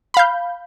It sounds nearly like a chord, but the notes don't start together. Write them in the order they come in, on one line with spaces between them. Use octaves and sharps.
B5 F5 G6